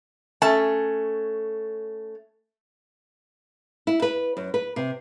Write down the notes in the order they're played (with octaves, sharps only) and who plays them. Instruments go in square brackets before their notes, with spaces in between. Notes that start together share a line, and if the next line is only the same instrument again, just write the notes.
[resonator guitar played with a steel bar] A3 C#4 A5
[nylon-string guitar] E4
B4
F#2
B4
C3